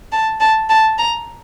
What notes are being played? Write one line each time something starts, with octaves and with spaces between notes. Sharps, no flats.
A5
A5
A5
A#5